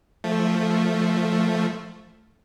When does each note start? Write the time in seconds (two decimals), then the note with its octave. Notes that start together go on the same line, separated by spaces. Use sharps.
0.24 F3 A3